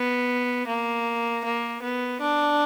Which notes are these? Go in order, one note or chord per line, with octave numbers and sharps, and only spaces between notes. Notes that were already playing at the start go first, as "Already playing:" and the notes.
Already playing: B3
A#3
A#3
B3
D4